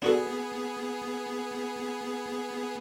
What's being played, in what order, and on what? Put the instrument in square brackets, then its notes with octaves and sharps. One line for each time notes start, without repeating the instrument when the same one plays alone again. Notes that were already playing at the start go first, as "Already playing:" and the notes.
[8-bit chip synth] B3 G#4 [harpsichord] D4 F#4 A4